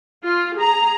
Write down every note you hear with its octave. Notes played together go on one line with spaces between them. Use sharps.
F4
G#4 A#5